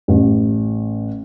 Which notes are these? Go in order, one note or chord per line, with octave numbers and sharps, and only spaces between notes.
A1